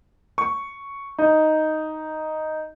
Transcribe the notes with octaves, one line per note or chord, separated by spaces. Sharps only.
C#6
D#4